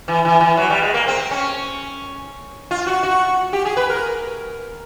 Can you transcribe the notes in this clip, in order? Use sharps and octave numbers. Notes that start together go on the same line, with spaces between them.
E3
E3
E3
F#3
G3
G#3
A#3
C4
C#4
F4
F#4
F#4
G4
G#4
B4
A#4